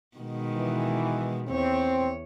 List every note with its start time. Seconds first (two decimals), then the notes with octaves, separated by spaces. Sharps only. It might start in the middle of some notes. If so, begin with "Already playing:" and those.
0.17 B2 D#3 G#3
0.57 E3
1.48 E2 C4 C#5